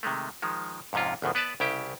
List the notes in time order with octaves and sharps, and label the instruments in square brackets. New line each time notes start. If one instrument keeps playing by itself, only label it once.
[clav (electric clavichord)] C3 D#3 G#3 A3
D#3 F3 G#3
F2 G#2 C3 C#4 F4
G#1 D2 B2 F3
B3 B4 D5 A5
C2 C#3 E4 G4 G5